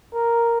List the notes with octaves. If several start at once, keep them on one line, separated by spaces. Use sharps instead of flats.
A#4